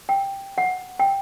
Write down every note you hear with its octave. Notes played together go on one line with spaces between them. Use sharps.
G5
F#5
G5